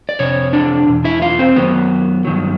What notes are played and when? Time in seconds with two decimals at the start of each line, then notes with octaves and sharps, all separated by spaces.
0.09 D5
0.19 F2 C3 C#5
0.53 D4 D5
0.87 E2 B2
1.04 E4 E5
1.22 F4 F5
1.39 C4 C5
1.56 F#2 D#3 F#3 B3 B4
2.25 G2 D#3 F#3